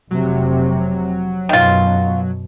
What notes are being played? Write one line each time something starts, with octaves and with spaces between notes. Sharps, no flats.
F1 C3 F#3
F#2 B2 D#3 F4